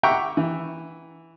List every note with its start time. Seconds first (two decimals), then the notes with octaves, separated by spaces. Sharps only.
0.03 E5 F#5 G5 A#5 C#6 D6
0.37 E3